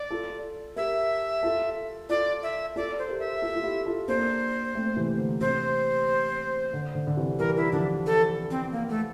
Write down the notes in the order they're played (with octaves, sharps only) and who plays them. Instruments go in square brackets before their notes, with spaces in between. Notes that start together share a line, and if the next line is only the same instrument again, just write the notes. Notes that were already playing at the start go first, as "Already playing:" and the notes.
Already playing: [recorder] D5
[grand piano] F4 A4
[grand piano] G4 A#4 [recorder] E5
[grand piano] F4 A4
[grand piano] F4 A4 [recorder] D5
[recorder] E5
[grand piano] F4 A4 [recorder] D5
[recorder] C5
[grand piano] G4 A#4
[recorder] E5
[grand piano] F4 A4
F4
E4 G4
F4 A4
[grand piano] A#3 D4 [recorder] C5
[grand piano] A3 C4
C3 E3
D3
[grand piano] C3 [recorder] C5
[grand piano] D3
D3
D3
C3 E3
[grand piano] E3 G3 [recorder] A#4
[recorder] E4
[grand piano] D3 F3 [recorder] D4
[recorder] A4
C4
A#3
A3